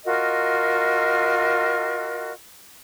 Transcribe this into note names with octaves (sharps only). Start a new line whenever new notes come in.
F4 F#4 A#4 D#5